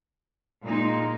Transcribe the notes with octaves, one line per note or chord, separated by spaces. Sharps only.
A#2 G#3 D#4